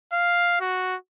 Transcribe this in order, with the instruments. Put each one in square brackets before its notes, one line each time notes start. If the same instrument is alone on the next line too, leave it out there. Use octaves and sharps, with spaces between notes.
[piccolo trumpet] F5
F#4